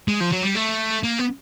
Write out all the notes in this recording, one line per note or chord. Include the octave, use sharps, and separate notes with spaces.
G#3
F3
F#3
G3
A3
A#3
B3